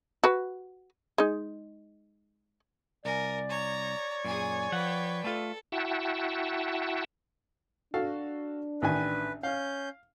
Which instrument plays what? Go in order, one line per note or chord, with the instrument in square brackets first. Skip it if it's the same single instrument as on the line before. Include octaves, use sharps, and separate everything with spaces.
[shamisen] F#4 B4
G#3 D#4
[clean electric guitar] C2 [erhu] A#4 [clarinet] D5 [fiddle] G#5
[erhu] C#5 [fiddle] A#5
[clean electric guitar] F#2 A#2 [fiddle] G#4 G#5
[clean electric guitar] F3 F#5 [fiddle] B4 G5
[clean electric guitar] A3 F4 [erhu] A4
[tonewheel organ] E4 F#4 E5 F#5 G5 A5
[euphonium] D4 [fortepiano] F#4 A4 F5
[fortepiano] A1 D#3 G#5 [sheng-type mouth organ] B4
[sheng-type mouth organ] C#4 G6 [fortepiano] F5